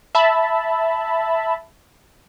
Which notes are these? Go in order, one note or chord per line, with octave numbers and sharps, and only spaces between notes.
E5 A5 B5